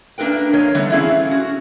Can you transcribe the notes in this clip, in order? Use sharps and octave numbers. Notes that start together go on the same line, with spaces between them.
A#3 D4 F4 A#4 B4 G5
F2 A#3 C#5 D#5
D3 E3 G3 A3 B3
C4 C#4 E4 G#4 E5 F5
A2
C#4 F#4